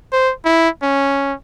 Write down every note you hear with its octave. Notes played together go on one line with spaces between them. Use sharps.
C5
E4
C#4